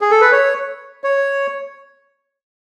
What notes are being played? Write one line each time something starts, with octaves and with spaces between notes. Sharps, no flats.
G#4
A4
B4
C#5
C#5